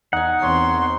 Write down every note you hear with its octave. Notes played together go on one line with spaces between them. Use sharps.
E2 D#4 F#5 G#5
E2 C4 C#5 C6